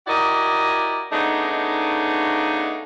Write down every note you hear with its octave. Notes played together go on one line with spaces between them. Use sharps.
E4 F#4 G4 A#4 D5 D#5
C#3 A3 B3 D4 D#4